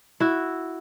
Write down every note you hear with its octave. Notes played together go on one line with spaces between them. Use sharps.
E4 F#4